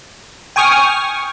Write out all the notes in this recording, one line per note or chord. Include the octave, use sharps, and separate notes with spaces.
G5 G#5 C#6 D#6 F6